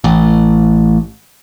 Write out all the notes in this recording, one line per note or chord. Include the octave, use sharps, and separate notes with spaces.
A1